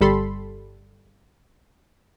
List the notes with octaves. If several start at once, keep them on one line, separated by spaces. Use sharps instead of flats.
G1 G3 A4 B5 C6